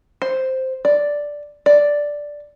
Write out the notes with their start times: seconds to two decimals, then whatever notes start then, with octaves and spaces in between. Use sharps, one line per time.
0.22 C5
0.85 D5
1.66 D5